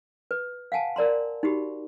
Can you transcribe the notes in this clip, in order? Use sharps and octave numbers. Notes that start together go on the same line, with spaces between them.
B4
F5 F#5 G#5 A5
A#4 D5 A#5 C6
D#4 F#4 G4 B5